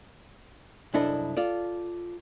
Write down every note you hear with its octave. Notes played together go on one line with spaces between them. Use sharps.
C2 F#2 D4 E4 A4 D#5
F4 A4 D5